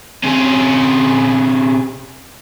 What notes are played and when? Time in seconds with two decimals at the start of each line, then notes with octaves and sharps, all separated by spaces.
0.24 C3 C#4